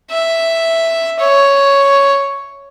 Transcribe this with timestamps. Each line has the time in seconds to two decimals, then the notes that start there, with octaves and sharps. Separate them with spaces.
0.11 E5
1.19 C#5